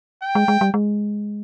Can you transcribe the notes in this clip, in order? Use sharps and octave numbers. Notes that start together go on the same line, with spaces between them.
G5
G#3
G#3
G3
G#3